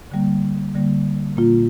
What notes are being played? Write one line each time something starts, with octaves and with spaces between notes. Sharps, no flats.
D3 G3 A#3
D3 G3 A#3
A#2 A#3 F4